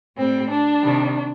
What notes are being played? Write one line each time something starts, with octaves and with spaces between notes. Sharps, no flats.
A2 G3 C4
D4
C3 D#3 G3